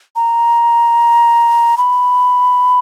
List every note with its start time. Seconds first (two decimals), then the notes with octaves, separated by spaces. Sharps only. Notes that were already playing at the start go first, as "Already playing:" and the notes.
0.16 A#5
1.78 B5